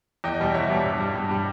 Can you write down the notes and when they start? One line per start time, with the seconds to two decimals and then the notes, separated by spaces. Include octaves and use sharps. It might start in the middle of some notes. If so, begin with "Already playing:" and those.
0.24 E2 D#5 G5
0.40 B2 G3
0.54 E2 C#5 E5
0.70 B2 G3
0.85 G2
1.00 G3
1.15 G2
1.31 G3